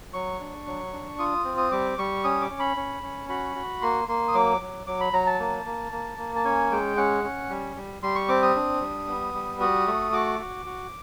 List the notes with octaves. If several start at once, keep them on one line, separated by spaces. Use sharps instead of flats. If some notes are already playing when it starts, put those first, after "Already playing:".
F#3 C#6
D4
F#3
D4
F4 D#6
C4
D#6
G3 D6
G3 C#6
C#4 D#6
D6
C#4
B5
C#4
C#4
F#4 B5
F#4
A#3 C6
A#3 C6
D#6
F#3 D6
F#3
F#3 D6
B5
F#3 A#5
A5
A#3
A#3
A#3
A#3
A5
C#4 G#5
G#3 G5
C#4 F#5
C#4
G3
G3
G3 C6
C#6
C4 D6
D#6
D4
G3
B3
G3
F#4 D#6
A3
F#4 D6
F#4
F#4